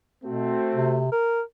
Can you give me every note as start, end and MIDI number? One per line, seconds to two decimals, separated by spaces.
0.24 0.55 47
0.24 1.03 57
0.24 1.03 60
0.24 1.03 66
0.75 1.11 48
1.12 1.41 70